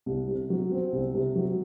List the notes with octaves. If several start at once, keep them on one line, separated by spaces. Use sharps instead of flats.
C2
C3
F#3
C4
C2
C3
F#3